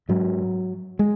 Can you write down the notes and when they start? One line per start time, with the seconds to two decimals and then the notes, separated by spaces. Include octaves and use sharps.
0.09 G#2 F#3
0.99 G#3